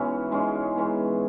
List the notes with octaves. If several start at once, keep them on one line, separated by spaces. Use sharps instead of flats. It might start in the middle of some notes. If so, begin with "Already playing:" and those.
Already playing: G#2 E3 B3 C#4 E4 F#4
G#2 G#3 C#4
G#2 E3 B3